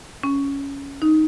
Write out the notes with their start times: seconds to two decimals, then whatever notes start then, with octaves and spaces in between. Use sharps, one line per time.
0.23 C#4
1.02 D#4